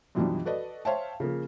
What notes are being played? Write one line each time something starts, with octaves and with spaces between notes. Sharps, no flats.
F#2 B2 E3 F3 G3 D4
F#4 A4 B4 D5 D#5
C5 C#5 E5 F5 G5 A5
C#3 F3 A#3